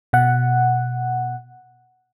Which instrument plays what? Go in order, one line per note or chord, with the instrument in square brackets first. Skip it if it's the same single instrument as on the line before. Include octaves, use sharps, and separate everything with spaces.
[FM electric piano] B2 F#5